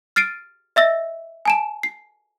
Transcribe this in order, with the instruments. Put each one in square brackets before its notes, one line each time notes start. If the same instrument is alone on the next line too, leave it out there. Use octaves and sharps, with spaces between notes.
[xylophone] F6 A6 C7 D7 D#7
D#5 E5 E6 A#6
G#5 A5 E7
C7